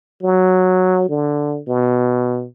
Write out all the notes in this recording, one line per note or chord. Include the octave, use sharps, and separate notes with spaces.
F#3
D3
B2